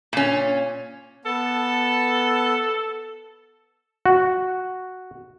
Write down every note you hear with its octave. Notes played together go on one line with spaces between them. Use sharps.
A#2 C#4
B3 A4 A5
F#4